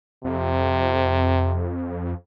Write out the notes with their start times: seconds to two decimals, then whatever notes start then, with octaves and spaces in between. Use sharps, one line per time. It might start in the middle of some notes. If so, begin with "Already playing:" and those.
0.24 F2 C3